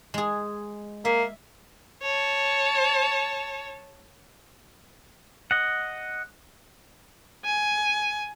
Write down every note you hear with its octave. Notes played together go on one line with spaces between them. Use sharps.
G#3 G#4
A#3 E5
C#5 A5
D#5 F#5
G#5